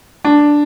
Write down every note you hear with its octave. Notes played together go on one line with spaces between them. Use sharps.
D4